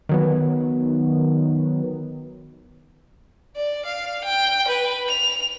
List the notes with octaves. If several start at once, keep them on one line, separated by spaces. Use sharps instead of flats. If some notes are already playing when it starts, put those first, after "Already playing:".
D#3 F#3 B3
D5
F5
G5
B4
F7